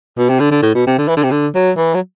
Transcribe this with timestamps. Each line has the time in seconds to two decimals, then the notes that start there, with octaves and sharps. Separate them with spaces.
0.18 B2
0.29 C3
0.39 D3
0.51 D3
0.62 A2
0.75 B2
0.86 C3
0.98 D3
1.08 E3
1.16 D3
1.23 C3
1.31 D3
1.55 F#3
1.77 E3
1.94 F#3